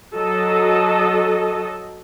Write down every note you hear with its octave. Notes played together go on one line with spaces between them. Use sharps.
F#3 A4 D#5